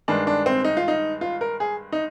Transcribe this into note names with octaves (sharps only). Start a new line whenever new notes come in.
G2 D#3 G#3 D4
D4
C4
D#4
F4
D#4
F4
A#4
G#4
D#4